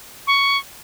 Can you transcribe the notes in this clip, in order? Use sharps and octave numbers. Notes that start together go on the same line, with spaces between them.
C#6